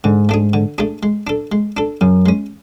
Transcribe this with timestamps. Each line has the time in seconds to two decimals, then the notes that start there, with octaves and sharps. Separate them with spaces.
0.04 G#2 D3
0.29 A3 D4 G#4
0.53 D3
0.78 A3 D4 G#4
1.03 G#3
1.27 D4 A4
1.52 G#3
1.77 D4 A4
2.01 F#2 C#3
2.26 G#3 C#4